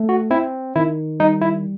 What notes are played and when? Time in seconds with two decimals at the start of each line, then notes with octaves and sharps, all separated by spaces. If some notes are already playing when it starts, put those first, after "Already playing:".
Already playing: A3
0.09 F#4
0.31 C4 E4
0.76 D#3 E4
1.20 G3 D#4
1.41 E4